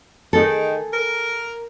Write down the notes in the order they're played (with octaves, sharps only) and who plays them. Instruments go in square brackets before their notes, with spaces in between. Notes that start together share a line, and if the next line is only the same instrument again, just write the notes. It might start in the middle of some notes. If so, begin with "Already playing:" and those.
[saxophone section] D#3 [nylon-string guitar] G#4 A4
[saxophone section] A#4